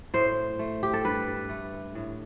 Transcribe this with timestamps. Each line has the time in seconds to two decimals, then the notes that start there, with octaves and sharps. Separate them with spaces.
0.14 A2 C5
0.59 A3
0.83 G4
0.94 A4
1.05 G2 B4
1.49 A3
1.95 A2